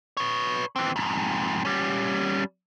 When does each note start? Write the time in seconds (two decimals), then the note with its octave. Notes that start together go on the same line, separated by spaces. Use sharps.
0.17 B4 C#5
0.76 E3 C4
0.96 F2 G#2
1.65 G3 C#4